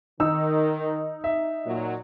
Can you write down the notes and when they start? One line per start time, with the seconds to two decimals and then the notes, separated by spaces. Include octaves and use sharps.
0.20 D#3 D#4 E6
1.24 E5
1.65 A#2 F#3